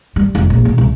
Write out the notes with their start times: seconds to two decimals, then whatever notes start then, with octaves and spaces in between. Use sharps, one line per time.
0.16 G3
0.35 F1
0.50 A#1
0.65 B2
0.78 C2